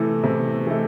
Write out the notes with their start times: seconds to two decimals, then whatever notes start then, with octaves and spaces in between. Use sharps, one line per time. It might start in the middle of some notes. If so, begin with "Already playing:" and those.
Already playing: C3 E3 A3
0.23 C3
0.67 E3 A3